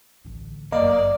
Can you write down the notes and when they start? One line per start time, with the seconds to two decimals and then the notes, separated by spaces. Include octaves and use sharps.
0.25 A1 D2
0.72 G1 F#2 A#3 D5 D#5